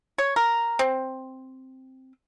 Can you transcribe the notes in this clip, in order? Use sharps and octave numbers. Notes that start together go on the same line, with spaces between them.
C#5
A#4
C4